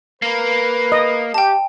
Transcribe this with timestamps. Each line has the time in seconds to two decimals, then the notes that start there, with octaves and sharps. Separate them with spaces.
0.22 A#3 B4
0.92 D#5
1.34 G4 G5 A5